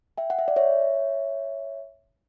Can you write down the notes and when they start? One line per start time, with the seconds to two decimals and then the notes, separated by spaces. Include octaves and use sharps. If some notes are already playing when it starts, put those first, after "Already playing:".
0.18 E5 G5
0.30 F#5
0.39 E5
0.48 D5
0.56 C#5 E5